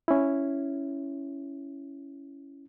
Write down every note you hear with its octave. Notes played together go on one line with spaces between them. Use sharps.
C#4 E4